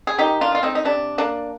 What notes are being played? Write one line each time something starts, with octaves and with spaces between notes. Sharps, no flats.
G#4
D#3 D#4 G4
D4 F4
G#3 F4
C4 D#4
D#4
C3 D4
A#3 D4